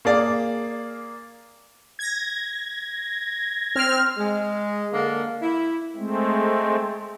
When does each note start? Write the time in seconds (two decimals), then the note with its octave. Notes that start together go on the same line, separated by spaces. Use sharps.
0.05 A#3 G#4 D5 F5
1.99 G#6 A#6
3.75 C4 F6
4.17 G#3
4.93 D3 A#3 D4 A#4
5.42 E4
5.96 G#3 A3 C4